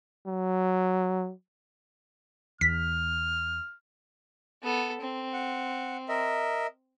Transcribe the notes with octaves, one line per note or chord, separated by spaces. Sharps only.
F#3
E2 F6 B6
B3 A4
C4
F#5
A#4 D#5 E5